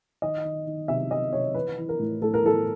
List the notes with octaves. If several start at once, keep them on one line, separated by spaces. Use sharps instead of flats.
D#3 D#5
D#3
D#3
C3 E5
D#3 D#5
C3 C#5
E3 B4
E3
A#4
A2
A2 A4
A#4
E3 A4